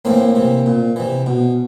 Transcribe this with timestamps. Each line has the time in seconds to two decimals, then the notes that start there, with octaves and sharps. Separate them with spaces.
0.05 A2 E3 A#3 C4
0.35 C3 E3
0.66 A#2
0.96 C3 E3
1.26 B2